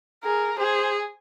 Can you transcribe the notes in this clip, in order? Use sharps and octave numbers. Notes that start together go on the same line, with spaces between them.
G#4 A#4
G#4 C5